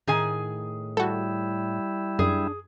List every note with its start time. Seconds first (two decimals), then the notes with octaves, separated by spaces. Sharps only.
0.07 A2 D#3 G#4 G#5
0.97 G3 E4 F#4 A4
2.19 F#2 D4 G#4